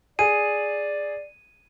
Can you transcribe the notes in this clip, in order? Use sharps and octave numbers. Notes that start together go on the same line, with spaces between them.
G#4 D5 D#7